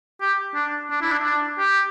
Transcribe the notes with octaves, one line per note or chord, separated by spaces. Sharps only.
G4
D4
D4
E4
D4
D4
G4